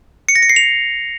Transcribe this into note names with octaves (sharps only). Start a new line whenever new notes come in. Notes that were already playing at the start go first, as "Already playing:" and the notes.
C#7
A#6
C#7
C7
F7